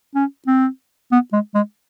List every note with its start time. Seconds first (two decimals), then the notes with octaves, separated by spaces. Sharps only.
0.15 C#4
0.47 C4
1.12 B3
1.33 G#3
1.54 G#3